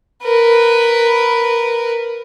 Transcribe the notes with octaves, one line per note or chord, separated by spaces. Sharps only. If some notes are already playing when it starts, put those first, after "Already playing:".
A#4 B4